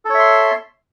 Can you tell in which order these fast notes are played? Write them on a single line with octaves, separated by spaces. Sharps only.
A4 C#5 E5 C6